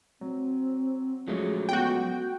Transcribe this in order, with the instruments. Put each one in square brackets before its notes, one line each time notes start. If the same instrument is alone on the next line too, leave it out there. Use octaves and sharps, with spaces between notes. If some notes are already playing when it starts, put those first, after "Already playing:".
[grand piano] F#3 [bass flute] C4
[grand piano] F3 G#3 C#4 [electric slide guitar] F#3 A3 [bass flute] G#4
[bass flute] B3 [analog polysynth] F#4 G5